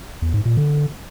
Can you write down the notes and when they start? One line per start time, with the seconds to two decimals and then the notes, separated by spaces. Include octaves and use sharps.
0.22 E2
0.34 G#2
0.45 A#2
0.57 D3